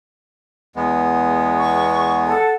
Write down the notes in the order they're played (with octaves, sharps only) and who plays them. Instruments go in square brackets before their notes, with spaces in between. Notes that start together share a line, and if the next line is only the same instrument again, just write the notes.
[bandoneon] E2 G#3 B3
[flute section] C#6
A4 F#5